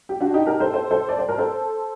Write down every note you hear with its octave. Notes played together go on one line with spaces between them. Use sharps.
G4
D4 F#4
D#4 G4
G4 A#4
A4 C5
A4 C5
A4 C5
D5
C5
A#4
A4 C5